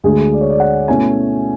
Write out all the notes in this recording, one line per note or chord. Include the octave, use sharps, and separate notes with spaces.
D2 D3 G#3 G#4
D5
C#5
D5
F#5
B2 A3 C#4 E4 G#5